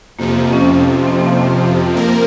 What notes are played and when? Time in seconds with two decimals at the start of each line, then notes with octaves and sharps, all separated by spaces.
0.19 F2 C3 F3 A#3
0.28 C4
0.39 A#3
0.53 C#4
0.62 C4
1.07 C4
1.17 A#3
1.26 C4
1.51 C4
1.96 F3 A#3 A#4